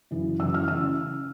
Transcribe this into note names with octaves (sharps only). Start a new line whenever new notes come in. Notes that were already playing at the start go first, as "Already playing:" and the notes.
F#2 C#3 E3
F#2 C#3 E3 E6
F6
C#3 E3 E6